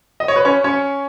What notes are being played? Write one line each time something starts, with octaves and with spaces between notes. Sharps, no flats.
D#5
C#5
B4
C#4 C#5
C#4 C#5